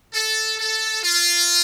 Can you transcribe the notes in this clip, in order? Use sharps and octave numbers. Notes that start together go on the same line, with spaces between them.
A4
A4
F4